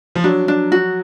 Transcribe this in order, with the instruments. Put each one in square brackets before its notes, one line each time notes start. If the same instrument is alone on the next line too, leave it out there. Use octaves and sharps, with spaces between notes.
[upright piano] F3
[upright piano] F#3 [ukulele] D4
[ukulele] D4
F#4